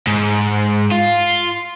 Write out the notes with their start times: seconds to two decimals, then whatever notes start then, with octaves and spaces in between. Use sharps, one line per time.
0.07 G#2
0.92 F4